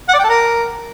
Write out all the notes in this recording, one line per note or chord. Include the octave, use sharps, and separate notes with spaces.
F#5
D5
G5
A4
A#4